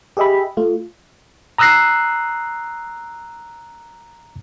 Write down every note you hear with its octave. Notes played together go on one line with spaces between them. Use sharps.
G4 G#4 D#5 E5 B5
A3 F4
A#5 D#6 E6 F#6 A#6 C7